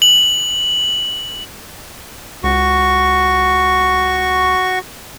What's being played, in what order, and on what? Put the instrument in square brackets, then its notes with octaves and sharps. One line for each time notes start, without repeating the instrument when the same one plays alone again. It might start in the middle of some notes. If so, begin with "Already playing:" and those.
[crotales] F#7
[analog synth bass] C#2 [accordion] F#4 C#6